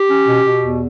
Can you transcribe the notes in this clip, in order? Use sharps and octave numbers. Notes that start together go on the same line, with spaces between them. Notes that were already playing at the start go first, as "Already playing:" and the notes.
Already playing: G4
C#4
B2
B2
E2